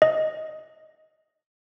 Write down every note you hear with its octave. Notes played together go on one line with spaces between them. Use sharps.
D#5